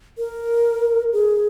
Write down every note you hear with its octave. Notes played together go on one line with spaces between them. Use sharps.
A#4
G#4